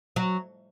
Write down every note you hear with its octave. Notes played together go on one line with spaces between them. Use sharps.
F#3